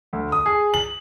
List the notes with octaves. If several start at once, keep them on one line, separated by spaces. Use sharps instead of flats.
D2
D#6
G#4
F#7